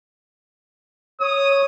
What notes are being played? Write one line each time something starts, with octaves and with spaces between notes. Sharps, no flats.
C#5 D#6